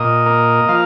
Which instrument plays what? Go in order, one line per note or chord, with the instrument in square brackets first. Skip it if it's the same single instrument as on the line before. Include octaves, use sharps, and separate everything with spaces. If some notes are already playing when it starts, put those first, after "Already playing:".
Already playing: [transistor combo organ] A#2 D#5
A#3
F3 F5